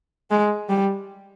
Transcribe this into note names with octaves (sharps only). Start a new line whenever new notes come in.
G#3
G3